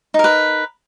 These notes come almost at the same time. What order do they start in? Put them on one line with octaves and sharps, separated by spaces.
D#4 A#4 B4